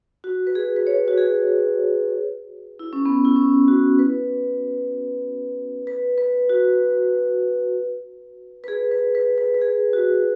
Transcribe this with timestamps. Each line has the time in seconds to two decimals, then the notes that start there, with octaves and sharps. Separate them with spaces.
0.24 F#4
0.47 B4
0.55 G#4
0.76 B4
0.87 C#5
1.08 F#4
1.18 G#4
2.79 E4
2.93 C#4
3.06 B3
3.25 E4
3.36 C#4
3.68 F#4
3.99 B4
5.87 B4
6.18 B4
6.49 F#4
8.64 B4
8.68 G#4
8.91 B4
9.15 B4
9.38 B4
9.55 B4
9.61 G#4
9.93 F#4